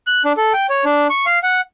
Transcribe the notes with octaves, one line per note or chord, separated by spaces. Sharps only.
F#6
D4
A4
G5
C#5
D4
C#6
F5
F#5